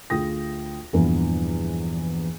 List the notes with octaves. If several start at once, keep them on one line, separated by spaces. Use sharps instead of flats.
D2 F4 G#4 G5 D#6 A#6
E2 G2 A#2 E3 F3 B3